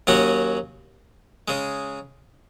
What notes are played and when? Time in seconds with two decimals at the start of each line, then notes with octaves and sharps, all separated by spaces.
0.07 D#2 D#3 F#3 C#4 F#4
1.48 C#3 G#3